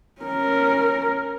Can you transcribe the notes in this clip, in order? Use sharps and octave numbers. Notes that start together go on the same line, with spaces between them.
C#4 A#4